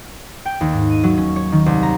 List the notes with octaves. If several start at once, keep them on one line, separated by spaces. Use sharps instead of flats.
G5
D#2
G#2
D#7
F#3
C#4
C#5
D#3
C2
A#5